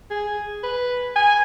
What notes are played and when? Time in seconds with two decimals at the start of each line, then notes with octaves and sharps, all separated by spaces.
0.11 G#4
0.63 B4
1.16 G#5